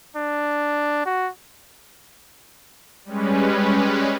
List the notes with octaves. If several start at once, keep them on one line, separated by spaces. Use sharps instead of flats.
D4
F#4
G3 G#3 C#4 B4